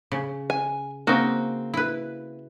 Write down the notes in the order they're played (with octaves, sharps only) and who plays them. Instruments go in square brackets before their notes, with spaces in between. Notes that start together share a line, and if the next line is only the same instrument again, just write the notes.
[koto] C#3
[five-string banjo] G#5
[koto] C#3 D#4 F#4 [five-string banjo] A#3 C4
[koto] E4 B4